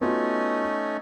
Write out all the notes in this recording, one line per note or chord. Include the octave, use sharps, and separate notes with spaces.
A3 B3 C#4 D#4 F4 F#4